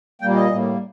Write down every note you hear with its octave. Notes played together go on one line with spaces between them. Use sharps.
A#2 G3 A#3 G5
D#5
A2 G3 A#3